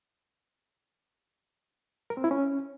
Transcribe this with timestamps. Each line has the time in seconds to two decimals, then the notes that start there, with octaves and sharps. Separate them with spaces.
2.10 A#4
2.17 C4
2.24 E4
2.31 C#4